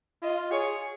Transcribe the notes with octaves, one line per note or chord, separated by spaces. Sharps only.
F4 D#5
G#4 C#5